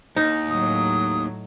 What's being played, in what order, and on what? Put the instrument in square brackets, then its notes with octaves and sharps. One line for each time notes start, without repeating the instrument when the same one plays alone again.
[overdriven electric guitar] D#2 [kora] D#4
[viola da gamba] A2 F#3 [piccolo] D#6